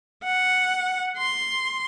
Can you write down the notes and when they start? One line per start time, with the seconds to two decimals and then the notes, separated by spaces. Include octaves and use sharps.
0.24 F#5
1.18 C6